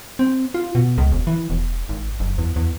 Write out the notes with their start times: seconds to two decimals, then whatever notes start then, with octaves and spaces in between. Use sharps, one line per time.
0.19 C4
0.54 F4
0.75 B2
0.98 C#2
1.12 E1
1.27 E3
1.50 E1
1.89 G#1
2.20 F#1
2.38 E2
2.56 E2